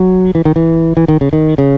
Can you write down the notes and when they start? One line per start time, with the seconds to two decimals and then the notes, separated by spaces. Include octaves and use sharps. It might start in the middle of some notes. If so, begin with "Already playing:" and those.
Already playing: F#3
0.35 E3
0.45 D#3
0.56 E3
0.97 E3
1.08 D#3
1.21 C#3
1.33 D#3
1.58 C#3